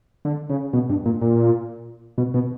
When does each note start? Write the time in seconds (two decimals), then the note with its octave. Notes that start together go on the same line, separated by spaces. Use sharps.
0.25 D3
0.50 C#3
0.73 B2
0.90 G2
1.06 A#2
1.21 A#2
2.18 B2
2.34 B2